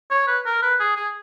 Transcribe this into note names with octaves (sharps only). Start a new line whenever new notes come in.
C#5
B4
A#4
B4
G#4
G#4